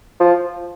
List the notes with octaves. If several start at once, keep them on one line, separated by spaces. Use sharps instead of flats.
F3